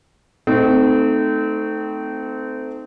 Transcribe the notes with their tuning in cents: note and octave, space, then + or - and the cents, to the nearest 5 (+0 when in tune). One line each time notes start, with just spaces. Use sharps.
A3 +0 C4 -25 D#4 -10